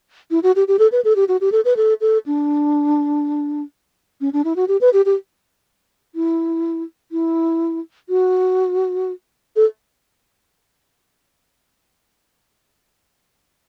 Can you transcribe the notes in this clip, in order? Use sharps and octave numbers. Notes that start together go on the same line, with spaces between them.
E4
F#4
G4
G4
A4
B4
A4
G4
F#4
G4
A4
B4
A4
A4
D4
C#4
D4
E4
F#4
G4
B4
G4
G4
E4
E4
F#4
A4